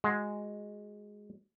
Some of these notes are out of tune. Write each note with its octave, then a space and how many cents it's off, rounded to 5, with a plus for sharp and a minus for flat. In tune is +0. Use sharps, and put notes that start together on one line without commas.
G#3 +0 F#4 -5